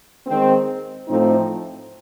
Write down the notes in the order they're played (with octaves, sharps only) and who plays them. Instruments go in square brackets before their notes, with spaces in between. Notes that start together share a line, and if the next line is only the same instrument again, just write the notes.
[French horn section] D#3 G#3 C4
A2 F3 A3 C4 D#4